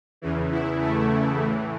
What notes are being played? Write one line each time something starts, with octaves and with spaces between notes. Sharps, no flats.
E2 C#3 E3
E4
A3
A2 E3